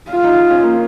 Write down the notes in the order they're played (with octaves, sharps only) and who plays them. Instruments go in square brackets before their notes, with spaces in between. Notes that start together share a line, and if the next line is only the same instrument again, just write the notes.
[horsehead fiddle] F4
[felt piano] D#4
C#4
A#3